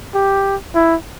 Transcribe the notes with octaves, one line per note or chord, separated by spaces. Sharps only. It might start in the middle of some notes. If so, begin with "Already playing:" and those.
G4
E4